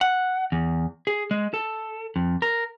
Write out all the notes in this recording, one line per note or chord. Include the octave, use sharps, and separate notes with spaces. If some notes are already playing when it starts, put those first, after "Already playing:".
F#5
E2
G#4
G#3
A4
F2
A#4